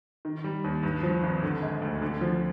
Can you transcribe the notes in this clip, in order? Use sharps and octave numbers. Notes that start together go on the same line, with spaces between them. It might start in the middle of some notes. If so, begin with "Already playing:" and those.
D#3
G3
D#2
G2
F3
G#1
D3
G#3
D2
D3
F3